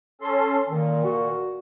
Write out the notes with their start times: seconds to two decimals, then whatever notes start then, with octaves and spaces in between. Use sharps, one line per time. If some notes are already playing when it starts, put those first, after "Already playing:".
0.21 C#4 A4 C6
0.69 A#2 D#3
1.04 F#4